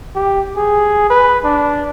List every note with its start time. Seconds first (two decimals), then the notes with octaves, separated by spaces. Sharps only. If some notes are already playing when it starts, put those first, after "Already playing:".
0.15 G4
0.57 G#4
1.10 B4
1.44 D4